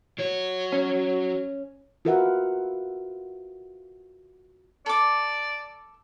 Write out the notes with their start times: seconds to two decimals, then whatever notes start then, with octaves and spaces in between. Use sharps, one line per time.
0.18 F#3 C#5
0.72 C#4
2.05 F4 F#4 A#4 B4 E5 F#5
4.86 A4 D5 D6